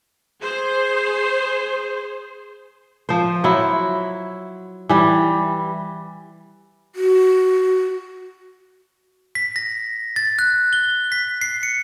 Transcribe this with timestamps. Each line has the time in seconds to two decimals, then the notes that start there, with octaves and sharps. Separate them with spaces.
0.42 G#4 C5
3.09 F3 C5
3.44 F#3 E4
4.89 E3 G3
6.95 F#4
9.35 B6
9.56 A#6
10.16 A6
10.39 F#6
10.73 G7
11.12 B6
11.41 C7
11.63 C#7